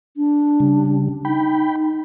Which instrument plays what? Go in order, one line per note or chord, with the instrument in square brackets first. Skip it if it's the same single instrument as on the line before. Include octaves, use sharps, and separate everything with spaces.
[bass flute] D4
[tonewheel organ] C#3 G3
[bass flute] D#4 [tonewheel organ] G5 B5